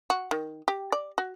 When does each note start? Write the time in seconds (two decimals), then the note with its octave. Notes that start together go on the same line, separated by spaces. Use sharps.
0.10 F#4
0.31 D#3
0.68 G4
0.92 D5
1.18 F#4